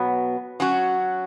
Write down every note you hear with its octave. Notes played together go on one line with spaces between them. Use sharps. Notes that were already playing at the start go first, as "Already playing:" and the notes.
Already playing: B2 F#3 B3
F#3 C#4 F#4